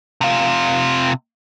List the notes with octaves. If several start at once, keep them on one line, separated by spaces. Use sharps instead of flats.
C3 F4